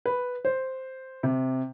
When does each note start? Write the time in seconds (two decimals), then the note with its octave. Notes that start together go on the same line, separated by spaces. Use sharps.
0.06 B4
0.45 C5
1.23 C3